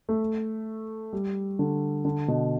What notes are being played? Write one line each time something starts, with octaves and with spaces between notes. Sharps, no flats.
A3
G3
D3
D3
B2